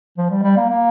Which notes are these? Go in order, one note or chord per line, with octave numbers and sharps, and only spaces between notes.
F3
G3
G3
A#3
A#3